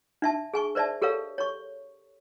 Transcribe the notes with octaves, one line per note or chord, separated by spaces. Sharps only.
D4 E5 A5
G#4 G#5 C#6
A#4 C5 D5 E5 A5
G4 A4 A#4 C#5 F5
C#5 C#6